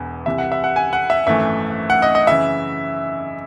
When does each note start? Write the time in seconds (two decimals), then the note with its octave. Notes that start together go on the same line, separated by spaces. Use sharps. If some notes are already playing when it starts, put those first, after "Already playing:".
Already playing: E1 E2
0.26 C2 C3 E3 E5
0.38 F#5
0.52 E5
0.64 F#5
0.76 G#5
0.93 F#5
1.10 E5
1.27 G#1 F#2 E3 A3 E5
1.90 F#5
2.02 D#5
2.15 D#5
2.27 F#2 C#3 E3 E5